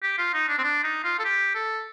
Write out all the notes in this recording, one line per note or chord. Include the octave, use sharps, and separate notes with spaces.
G4
F4
D#4
D4
C4
D4
D#4
F4
A4
G4
A4